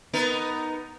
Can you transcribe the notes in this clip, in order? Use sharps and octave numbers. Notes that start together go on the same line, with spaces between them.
B3 D#4 A#4